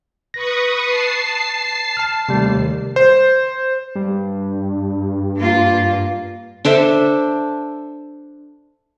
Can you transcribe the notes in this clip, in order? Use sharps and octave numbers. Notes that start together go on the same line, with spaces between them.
B4 C#6 D#6 A#6
A5 C7
A5 F6
D#2 C3 G3 A3
C5
G2
A#3 F4
D4 A4 C5 E5